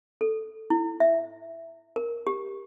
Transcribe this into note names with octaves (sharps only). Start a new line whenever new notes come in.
A4
E4
E5
A#4
G4